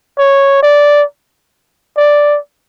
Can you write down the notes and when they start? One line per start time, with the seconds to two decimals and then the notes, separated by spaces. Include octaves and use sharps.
0.18 C#5
0.63 D5
1.98 D5